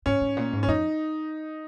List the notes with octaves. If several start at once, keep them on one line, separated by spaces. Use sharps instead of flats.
G#2 C#4
G#2
A#2
G#2
C#4
F2 D#4